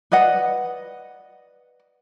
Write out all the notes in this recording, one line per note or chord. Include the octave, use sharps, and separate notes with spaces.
B4 D5 D#5 F#5